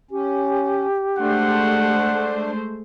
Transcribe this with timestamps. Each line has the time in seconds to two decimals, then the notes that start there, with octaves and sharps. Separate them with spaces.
0.11 C#4 G4
1.19 G#3 A3 D4 C5 F#5